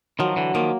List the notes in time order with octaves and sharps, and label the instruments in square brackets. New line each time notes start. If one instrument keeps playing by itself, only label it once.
[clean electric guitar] D#3 F3 [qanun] F#3
[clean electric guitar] D3 E3
[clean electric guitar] D#3 F3 [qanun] A#3